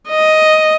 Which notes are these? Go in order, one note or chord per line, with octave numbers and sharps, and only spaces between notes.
D#5